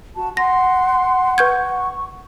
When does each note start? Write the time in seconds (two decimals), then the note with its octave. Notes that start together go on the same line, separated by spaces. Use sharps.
0.16 F#4 A5
0.37 F#5 C6 A#6
1.38 B4 C#6 G6 G#6